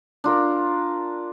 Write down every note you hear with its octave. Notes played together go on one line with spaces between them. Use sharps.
D4 F4 A#4